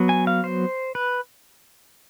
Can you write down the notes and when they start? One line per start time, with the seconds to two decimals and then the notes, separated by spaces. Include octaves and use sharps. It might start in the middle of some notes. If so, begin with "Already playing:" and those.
Already playing: F#3 B3
0.09 G#5
0.27 F5
0.44 C5
0.95 B4